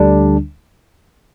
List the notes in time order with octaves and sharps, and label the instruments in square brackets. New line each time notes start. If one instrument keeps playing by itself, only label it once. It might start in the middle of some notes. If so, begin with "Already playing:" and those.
Already playing: [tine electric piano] D2 D3 G3 D4